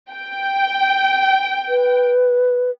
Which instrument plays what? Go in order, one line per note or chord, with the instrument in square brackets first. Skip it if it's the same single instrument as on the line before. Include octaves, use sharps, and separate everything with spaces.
[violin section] G5
[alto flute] B4